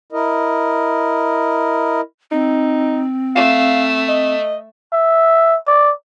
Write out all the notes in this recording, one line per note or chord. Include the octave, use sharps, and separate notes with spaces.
E4 A#4 D#5
C4 D#4
A3 F5
D#5
E5
D5